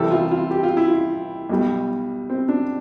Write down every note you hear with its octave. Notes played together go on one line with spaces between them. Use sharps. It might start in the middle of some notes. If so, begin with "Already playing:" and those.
Already playing: C2 C3 E3 G3 A4
F4
F4
G4
F4
E4
F4
B1 B2 G3
C4
D4